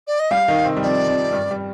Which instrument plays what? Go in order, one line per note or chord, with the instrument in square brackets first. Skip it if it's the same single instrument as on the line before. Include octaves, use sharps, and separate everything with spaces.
[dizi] D5
D#5
[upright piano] G3 G4 [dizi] F5
[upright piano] D#3 D#4
C3 C4
G3
[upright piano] F2 F3 [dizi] D5
[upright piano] F2 F3
G2 G3
G3